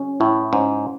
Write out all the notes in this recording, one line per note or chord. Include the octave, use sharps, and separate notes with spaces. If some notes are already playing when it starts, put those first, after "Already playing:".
Already playing: C#4
A2 E4
G#2 C#4